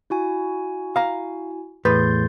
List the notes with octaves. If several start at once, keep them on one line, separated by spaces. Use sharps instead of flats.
E4 F#4 G#5
F5 A#5
E2 A2 B4 C6 G6 A6